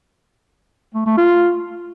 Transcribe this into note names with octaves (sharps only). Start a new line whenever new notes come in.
A3
A3
F4